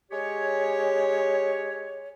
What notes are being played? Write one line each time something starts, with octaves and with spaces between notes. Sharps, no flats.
G#3 G4 C#5